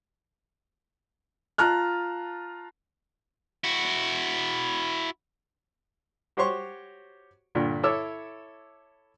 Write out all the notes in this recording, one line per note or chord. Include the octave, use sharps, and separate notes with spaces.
F4 A5 A#5 F6 F#6
E4 F#4
F#4 G4 C5 C#5 C6 C#6
G2 A#2 D3
E4 A4 C#5 E5 D6 E6